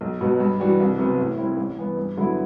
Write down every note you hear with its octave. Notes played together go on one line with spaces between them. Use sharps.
B1
B2 F#3 B3 F#4
G2
E3 G3 D4 F#4
C2
C3 F#3 B3
A2
G3 C4 E4
A1
G2 E3 B3
G2
D3 F#3 B3 E4